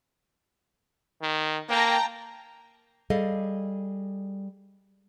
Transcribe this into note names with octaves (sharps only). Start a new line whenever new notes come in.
D#3
A#3 G5 A5 A#5
G3 G#4 A4 D#5 F5